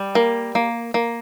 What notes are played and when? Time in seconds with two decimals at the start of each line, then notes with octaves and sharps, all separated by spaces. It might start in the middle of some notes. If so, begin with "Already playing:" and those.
Already playing: G3
0.15 A#3
0.55 A#3
0.94 A#3